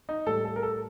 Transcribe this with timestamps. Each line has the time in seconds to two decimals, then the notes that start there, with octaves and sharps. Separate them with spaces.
0.09 D#4
0.26 A2 G3 A4
0.45 A4
0.56 A#4
0.63 A4